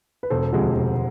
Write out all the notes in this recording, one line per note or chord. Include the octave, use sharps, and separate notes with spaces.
B4
E1 A4 C5
D2 C3 F3 G#3
E1